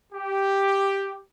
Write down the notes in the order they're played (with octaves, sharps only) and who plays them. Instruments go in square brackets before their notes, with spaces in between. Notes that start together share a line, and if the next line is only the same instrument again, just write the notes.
[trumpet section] G4